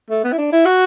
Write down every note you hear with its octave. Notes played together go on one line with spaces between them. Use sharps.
A3
B3
E4
D4
E4
F#4